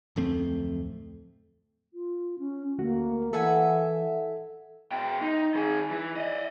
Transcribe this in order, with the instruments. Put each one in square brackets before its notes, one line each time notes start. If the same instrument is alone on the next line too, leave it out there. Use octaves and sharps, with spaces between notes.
[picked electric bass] D1 F2 A3 C4
[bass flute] F4
C#4
[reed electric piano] D2 A3 F#4 [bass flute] A#3
[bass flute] E3 [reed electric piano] A4 [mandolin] E5 F#5 G#5
[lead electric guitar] B2 G5
D#4
D#3 G#4
E3
D5 D#5